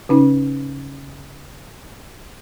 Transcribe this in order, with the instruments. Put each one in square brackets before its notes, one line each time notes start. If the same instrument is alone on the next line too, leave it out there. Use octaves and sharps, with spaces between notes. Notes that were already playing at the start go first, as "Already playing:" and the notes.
[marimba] C#3 C#4 D#4